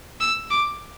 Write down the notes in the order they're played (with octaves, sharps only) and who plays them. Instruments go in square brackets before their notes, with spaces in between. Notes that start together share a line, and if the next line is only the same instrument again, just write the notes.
[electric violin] E6
D6